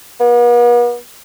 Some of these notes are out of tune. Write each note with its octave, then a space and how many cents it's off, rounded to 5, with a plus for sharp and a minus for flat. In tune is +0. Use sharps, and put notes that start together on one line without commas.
B3 -45